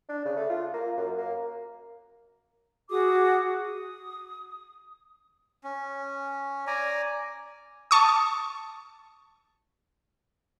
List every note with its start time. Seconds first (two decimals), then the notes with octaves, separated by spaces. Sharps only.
0.09 D4
0.25 C#3
0.37 A3
0.49 F4
0.74 A#3
0.97 F#2
1.18 A#3
2.90 F#4 G#4 D6 D#6
3.61 D#6
5.64 C#4
6.67 D5 G#5 A#5
7.91 A5 C#6 D#6